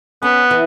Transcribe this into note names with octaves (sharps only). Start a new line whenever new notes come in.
B3 C#4
E3